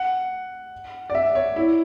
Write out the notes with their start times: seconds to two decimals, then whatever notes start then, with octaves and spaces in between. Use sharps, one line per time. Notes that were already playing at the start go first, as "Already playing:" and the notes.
Already playing: F#5
1.10 D5
1.15 E5
1.35 C#5
1.56 E4